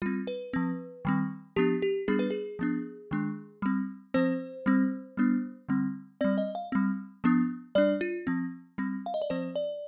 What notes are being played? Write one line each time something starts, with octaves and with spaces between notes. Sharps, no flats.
G3 C4 F4
B4
F3 C4
D#3 G3 C4
F3 B3 D4 G4
G4
G3 B3 D4 G#4
B4
G#4
F3 B3 D4
D#3 G#3 D4
G3 C4
F3 C4 C5
G3 C4
G3 B3 D4
D3 G3 C4
G3 C4 D5
D#5
F5
G3 C4
F3 B3 D4
G3 D4 D5
F4
F3 C4
G3 C4
F5
D#5
D5
F3 C4 C5
D5